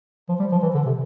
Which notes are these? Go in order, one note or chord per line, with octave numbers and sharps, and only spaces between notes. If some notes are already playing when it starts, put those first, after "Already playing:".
F3
G3
F3
E3
D3
C3